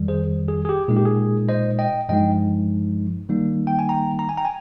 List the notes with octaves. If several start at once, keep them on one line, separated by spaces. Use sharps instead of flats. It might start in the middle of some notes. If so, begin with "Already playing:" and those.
Already playing: F2 D#3 G3
G#4 C5
G#4
G#4
G4
A#2 G#3 D#4 G#4
G4
G#4
C5 D#5
D#5 G5
G2 F3 G#3 D#4 D#5 G5
D#3 G3 A#3 D#4
G5
G#5
G5 A#5
A#5
G#5
G5 A#5
G#5